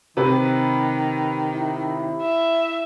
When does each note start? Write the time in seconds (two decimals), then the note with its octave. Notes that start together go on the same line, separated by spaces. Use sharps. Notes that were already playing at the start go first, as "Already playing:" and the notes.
0.17 C3 D#3 B4
1.53 E4
2.23 E5